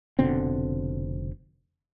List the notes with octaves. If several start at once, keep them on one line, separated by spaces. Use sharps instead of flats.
F1 B2 D3 C4